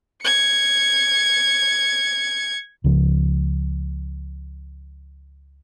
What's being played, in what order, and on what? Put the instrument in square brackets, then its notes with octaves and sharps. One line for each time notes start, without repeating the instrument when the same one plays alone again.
[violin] G#6 C#7
[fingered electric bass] C#2 C#3 F3